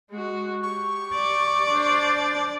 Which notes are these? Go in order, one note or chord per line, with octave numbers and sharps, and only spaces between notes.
G#3 F#4
G4 C#6
D5
D4 C5